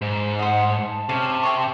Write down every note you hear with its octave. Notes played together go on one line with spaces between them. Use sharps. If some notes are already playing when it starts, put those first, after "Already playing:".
G#2
C5 D#5 F#5
A5
C3 C#4
G5 G#5 C#6